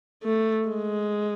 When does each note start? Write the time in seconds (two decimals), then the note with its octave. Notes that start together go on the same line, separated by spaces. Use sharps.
0.23 A3
0.68 G#3